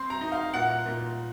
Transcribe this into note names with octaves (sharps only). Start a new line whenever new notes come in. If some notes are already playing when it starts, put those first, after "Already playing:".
Already playing: C4 C6
A#5
D#4
F5
A#2 F#5
A#2